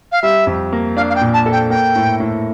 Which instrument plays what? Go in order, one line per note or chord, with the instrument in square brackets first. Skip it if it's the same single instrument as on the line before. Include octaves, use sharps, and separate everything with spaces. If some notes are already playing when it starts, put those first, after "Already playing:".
[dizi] F5
[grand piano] G3 [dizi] E5
[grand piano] F2
A#3
[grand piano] D4 [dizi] F5
[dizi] F5
G5
[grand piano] A#2
[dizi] A5
[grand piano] A4
[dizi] G5
[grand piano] A#3 [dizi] G5
[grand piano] A2
A2